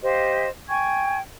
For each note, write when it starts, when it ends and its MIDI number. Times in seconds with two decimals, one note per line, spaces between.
0.03 0.49 67
0.03 0.49 72
0.03 0.49 75
0.03 0.49 77
0.69 1.18 79
0.69 1.18 80
0.69 1.18 85
0.69 1.18 92